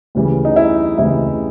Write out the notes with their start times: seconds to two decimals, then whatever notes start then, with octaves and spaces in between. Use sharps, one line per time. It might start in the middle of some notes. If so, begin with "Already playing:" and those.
0.15 D2 C#3 E3 G3
0.45 D#4
0.56 E4
0.98 D2 C#3 E3 G3 E4